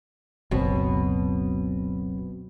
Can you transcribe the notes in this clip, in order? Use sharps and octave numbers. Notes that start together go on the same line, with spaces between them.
F#1 C#2 B2 F#3 C4